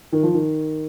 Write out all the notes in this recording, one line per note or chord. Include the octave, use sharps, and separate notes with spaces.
D#3
F3
D#3